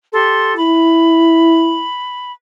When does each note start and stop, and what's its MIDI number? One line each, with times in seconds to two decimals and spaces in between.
0.14 0.54 67
0.14 0.54 69
0.14 0.54 84
0.57 1.85 64
0.57 2.32 83